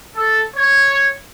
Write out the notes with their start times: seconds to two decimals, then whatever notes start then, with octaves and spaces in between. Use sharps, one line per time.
0.15 A4
0.55 C#5